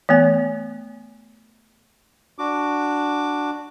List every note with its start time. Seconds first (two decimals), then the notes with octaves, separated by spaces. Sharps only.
0.09 E3 A3 B3 G#5
2.38 D4 F#4 D6